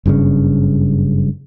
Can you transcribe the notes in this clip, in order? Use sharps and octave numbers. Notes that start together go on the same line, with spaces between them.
F#1 G2 A#2 C#3